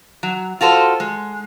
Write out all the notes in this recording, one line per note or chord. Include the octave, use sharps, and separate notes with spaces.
F#3
F4 F#4 A4 C5
G#3